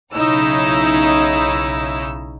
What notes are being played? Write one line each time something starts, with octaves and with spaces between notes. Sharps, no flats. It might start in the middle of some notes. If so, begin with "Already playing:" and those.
B1 C#3 D#4 E4 C#5 E6